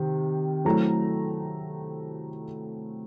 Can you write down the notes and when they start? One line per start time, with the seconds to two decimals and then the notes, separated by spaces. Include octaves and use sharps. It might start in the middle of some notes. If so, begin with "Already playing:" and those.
Already playing: C3 D#3
0.65 F#3 A3 C4 E4 A#5